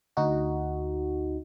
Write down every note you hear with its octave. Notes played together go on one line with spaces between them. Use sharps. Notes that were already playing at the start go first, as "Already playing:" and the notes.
D2 D#4 F#4